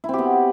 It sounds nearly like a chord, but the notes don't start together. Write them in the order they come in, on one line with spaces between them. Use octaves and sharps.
E4 C4 G4 B3